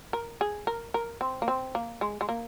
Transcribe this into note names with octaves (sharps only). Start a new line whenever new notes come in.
A#4
G#4
A#4
A#4
C4
A#3
C4
A#3
G#3
G#3
A#3